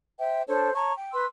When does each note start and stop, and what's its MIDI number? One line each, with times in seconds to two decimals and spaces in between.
0.18 0.42 72
0.18 0.42 76
0.18 0.42 79
0.47 0.73 62
0.47 0.73 69
0.47 0.73 72
0.47 0.73 73
0.74 0.93 73
0.74 0.93 81
0.74 0.93 82
0.74 0.93 85
0.96 1.11 79
1.13 1.26 71
1.13 1.26 84
1.13 1.26 88